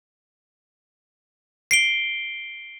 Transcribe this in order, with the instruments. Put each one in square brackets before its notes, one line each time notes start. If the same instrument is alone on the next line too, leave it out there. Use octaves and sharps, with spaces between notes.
[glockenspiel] C7 D7 G7